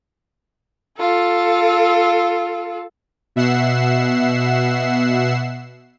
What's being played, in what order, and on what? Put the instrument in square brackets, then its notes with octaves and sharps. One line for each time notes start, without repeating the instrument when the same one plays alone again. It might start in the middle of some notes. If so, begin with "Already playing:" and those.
[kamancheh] F4 A4
[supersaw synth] B2 E5 F#5 C7 E7